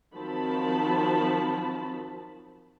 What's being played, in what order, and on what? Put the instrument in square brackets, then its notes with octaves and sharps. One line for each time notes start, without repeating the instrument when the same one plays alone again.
[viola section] D#3 F3 F#3 C4 A5 B5